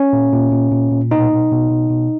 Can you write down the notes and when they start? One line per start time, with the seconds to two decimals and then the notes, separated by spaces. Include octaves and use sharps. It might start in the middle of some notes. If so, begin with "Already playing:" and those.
Already playing: C#4
0.13 A#2
0.32 A#2
0.52 A#2
0.71 A#2
0.92 A#2
1.11 B2 D#4
1.31 B2
1.51 B2
1.71 B2
1.90 B2